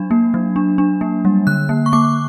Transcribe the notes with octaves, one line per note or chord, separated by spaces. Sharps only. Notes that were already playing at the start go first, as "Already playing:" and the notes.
Already playing: F#3 D4
A#3
F#3
D4
D4
A#3
G3
D3 F#6
A#3
C#6
A#3 D6